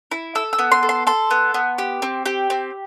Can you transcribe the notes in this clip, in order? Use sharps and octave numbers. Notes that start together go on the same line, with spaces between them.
E4
A4 E6
E6
B3
C6
A4
C6
A4 C6
B3
B3
G4
C4
G4
C4